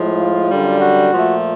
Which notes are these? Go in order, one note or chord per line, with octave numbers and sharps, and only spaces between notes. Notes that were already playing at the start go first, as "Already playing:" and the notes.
Already playing: A2 F3 G#3
F4
F#2 D3 G3
F#4
A#2 F3 A3